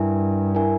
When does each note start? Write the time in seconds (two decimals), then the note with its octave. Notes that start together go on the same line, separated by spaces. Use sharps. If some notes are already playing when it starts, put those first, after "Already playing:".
Already playing: G2 E4 A#4 E5 G#5
0.55 E4 A#4 E5 G#5